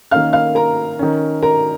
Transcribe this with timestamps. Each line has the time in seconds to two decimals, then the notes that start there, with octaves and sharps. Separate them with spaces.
0.11 D#3 A#3 C#4 F5 F6
0.33 F5 F6
0.55 A#4 A#5
0.99 D#3 C#4
1.42 A#4 A#5